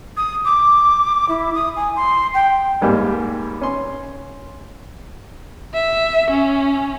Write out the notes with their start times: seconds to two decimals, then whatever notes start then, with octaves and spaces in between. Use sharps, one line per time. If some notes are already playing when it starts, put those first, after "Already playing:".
0.16 D#6
0.44 D6
1.28 E4
1.54 D#6
1.76 G#5
1.96 C6
2.33 G5
2.81 D#2 G#2 G3 A#3
3.61 C#4 C6
5.74 E5
6.31 C#4